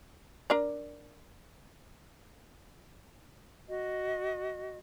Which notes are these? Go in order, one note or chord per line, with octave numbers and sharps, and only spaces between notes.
D4 A#4 D5
F#4 D#5